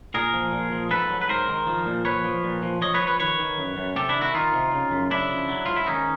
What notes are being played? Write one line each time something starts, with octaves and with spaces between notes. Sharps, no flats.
A#2 G#4 A#4
F3
A#2
F3
G#2 A4 B4
F#3
B4
G#2 A#4 C5
D#3
F3
A#2
F3 B4 C#5
F3
A#2
F3
F3 C#5 D#5
B4 C#5
F3
B4 C#5
D#3 B4 C#5
D#3
F#2
F#2
C3 G4 A4
D4 E4
D#3
E4 F#4
D#3 D#4 F4
C3
C#3
F#2
C#3 D4 E4
F3
F#3
G#2 F4
E4
D#3 C#4 D#4